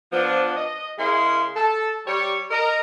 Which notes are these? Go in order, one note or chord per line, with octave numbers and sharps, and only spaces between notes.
F3 B3 D4
D#5
C#3 G#3 E4 A#4 F5 C6
A4 A5
G3 C#5
A#4 D#5 A#5